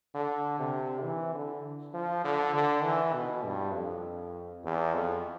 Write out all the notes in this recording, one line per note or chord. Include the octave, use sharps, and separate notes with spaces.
D3
C3
E3
D3
F3
D3
D3
E3
B2
G2
F2
E2
F2